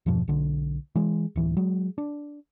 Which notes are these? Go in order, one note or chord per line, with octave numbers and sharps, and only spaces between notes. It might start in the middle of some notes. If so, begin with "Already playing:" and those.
E2 G2 B2 F3
B1 D3
E3 G#3
D1 E3
F#3 G#3
D4